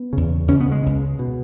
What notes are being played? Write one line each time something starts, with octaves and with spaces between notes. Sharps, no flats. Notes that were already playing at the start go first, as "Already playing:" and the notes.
Already playing: B3
E2 C#3
C#2 C#3 C#4
B3
G#3
C#2 C#3
B2